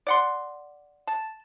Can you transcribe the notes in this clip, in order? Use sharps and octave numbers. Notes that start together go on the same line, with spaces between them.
D5 F#5 C6
A5